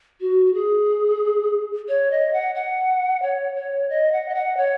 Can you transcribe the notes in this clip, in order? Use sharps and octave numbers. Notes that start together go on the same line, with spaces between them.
F#4
F#4
G#4
C#5
D#5
F#5
F#5
C#5
C#5
D#5
F#5
D#5
F#5
C#5